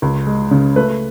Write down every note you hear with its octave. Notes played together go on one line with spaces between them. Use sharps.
C#2
G#3
C#3
A3 B4